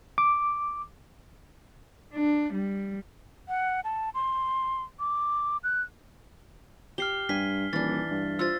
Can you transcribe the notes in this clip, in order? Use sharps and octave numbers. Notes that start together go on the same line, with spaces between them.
D6
D4
G3
F#5
A5
C6
D6
F#6
G4 F6 C7 G7
G2 G#5 B6
D#1 E3 D4 A6
G2
F4 C5 E6 A6